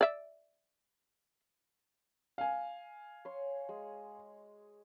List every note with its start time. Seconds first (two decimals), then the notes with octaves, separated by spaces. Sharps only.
0.01 D5 E5
2.38 F5 G#5
3.25 C#5 C6
3.69 G#3